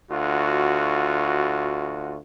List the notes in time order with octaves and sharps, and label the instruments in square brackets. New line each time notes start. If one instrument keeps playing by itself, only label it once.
[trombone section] D2 F4 F#4